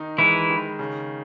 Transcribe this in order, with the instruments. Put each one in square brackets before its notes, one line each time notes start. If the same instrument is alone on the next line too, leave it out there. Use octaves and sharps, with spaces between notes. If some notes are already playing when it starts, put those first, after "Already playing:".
Already playing: [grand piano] D#3 D#4
[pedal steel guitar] E3 E4 [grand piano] G#3
[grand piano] D#3
C#3